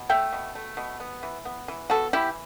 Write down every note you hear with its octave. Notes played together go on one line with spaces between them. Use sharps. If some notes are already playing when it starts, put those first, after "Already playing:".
Already playing: B2
A3 E5 G5
B2
A3
B2
B3
E3
B3
E3
B3 F#4 A4
E3 E4 G4